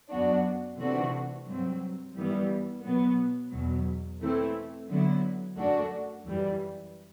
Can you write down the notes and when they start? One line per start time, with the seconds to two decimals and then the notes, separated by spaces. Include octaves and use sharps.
0.10 F#2 F#3 B3 D4 F#4
0.78 C3 E3 A3 D4 F#4
1.46 G2 F#3 C4
2.15 G2 E3 G3 B3
2.83 B2 F#3 B3
3.52 E2 B2 F#3
4.20 E3 A3 C4 E4
4.88 D3 F#3 B3 E4
5.56 F#2 F#3 A3 D4 F#4
6.24 F#2 E3 G3